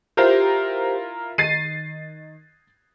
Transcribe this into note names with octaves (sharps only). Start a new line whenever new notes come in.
E4 F4 G4 A#4 C5
D#3 A6 C7 D#7